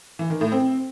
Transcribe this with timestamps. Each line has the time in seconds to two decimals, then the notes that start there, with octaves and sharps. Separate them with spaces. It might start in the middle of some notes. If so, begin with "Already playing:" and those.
0.19 E3
0.30 D#3
0.41 A2
0.52 C4